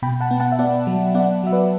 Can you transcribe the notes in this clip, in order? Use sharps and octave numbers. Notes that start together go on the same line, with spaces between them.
B2 G5 B5
F#5 A5
B3
F#5 A5
E5
B3 D5 F#5
F#3
B3 D5 F#5
F#3 E5
B4 D5